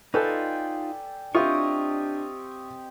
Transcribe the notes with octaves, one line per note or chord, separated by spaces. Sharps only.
D#4 F4 A4 B4 D5 G5 G#5
C4 D4 E4 F4 G4 D#5 C#6